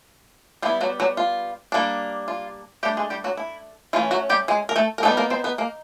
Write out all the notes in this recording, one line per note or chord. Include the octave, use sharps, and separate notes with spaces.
G3 B3 E4 F4
F#3 F#4
F#3 F#4
F4
G3 A#3 D4
F4
G3 A3 D4 G4
G#3 G#4
G3 G4
F#3 F#4
E4
E3 A3 C#4 F4
F#3 F#4
G3 G4
G#3 G#4
A#4
A3 A4
A#4
G3 A3 B3 D#4 A4
A#3 A#4
C4 C5
B3 B4
A#3 A#4